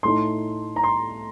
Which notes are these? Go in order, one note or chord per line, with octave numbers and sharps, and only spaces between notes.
A2 A3 D#4 C6
A#5
C6